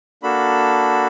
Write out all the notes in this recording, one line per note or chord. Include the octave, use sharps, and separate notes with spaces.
A#3 D4 F#4 A4 B5